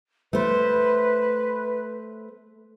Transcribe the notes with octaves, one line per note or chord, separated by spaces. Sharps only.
A3 B4 C5